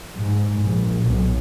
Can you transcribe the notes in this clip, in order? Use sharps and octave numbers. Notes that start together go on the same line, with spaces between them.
G#2
A#1
B1